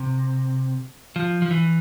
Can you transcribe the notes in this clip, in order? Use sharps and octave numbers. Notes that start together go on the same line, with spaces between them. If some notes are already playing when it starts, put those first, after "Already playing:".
Already playing: C3
F3
F3
E3